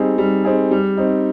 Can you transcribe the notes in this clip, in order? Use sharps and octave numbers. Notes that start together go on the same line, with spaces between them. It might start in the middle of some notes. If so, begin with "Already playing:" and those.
Already playing: G3 C4 D#4 G#4
G3
C4 D#4 G#4
G3
C4 D#4